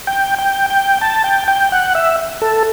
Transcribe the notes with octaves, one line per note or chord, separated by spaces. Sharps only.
G5
G5
G5
A5
G5
G5
F#5
E5
A4